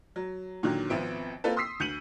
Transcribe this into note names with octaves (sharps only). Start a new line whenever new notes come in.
F#3
A#2 D3 D#3 F#3
G#1 F3 B3 C4 E5 D7
A#3 C4 F4 A4 B4
C6 D#6 E6 B6 C7
D2 G6 C#7 D#7 F#7